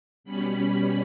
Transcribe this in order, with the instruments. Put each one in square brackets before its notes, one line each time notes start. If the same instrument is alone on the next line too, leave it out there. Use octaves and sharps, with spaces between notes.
[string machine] B2 G3 C#4 B5